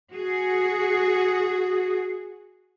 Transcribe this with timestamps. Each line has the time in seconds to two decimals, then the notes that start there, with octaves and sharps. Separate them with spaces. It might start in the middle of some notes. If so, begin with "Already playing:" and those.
0.12 F#4 G#4